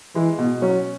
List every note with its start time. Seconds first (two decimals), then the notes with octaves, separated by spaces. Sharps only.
0.15 E3 G#3
0.38 B2
0.62 F#3 C#4